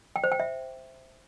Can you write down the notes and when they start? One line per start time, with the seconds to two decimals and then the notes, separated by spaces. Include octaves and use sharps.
0.16 G5
0.24 C5
0.32 G5
0.40 E5